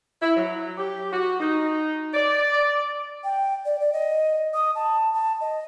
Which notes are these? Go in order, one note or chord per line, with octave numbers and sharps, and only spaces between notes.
E4
F#3
G4
F#4
D#4
D5
G5
D5
D5
D#5
D#6
A5
A5
D#5